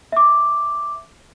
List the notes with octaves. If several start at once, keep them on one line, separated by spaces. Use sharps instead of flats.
E5 D6